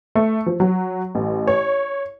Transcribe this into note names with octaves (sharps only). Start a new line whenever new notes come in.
A3
F3
F#3
A1
C#5